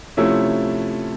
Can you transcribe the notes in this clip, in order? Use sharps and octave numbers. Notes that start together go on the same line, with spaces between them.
C3 F3 A3 C#4 E4